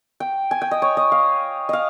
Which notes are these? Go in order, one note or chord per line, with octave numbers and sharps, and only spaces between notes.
G5
G#5
G5
D#5
C#5
D#5
F5
D#5 F5